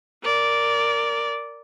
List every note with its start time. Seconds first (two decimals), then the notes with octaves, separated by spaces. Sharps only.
0.23 A#4 D5